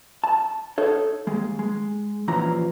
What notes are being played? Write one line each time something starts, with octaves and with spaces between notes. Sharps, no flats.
A5
D#4 A4 C#5
D#2 G#3
G#3
D#2 A#2 E3 F3 C#4 A#5